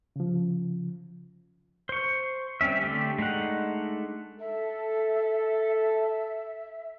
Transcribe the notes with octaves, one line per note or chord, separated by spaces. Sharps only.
C#3 F3
C5 C#6
G3 C4 C#4 E5
D3 A3 G4 D5
G#3 A3 D4 D#4 F#5
A4 E5